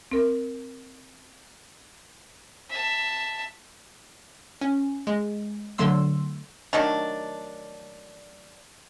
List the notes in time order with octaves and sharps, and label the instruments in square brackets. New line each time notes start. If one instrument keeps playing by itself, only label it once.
[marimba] C4 A#4
[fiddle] E5 A5
[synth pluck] C#4
G#3
D3 F#3 A3 C6 E6
[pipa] D#3 F#3 A3 D4